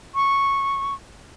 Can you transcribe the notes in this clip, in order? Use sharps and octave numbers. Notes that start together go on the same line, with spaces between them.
C#6